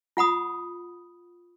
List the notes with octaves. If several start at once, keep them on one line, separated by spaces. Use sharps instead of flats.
F4 F#5 B5 D#6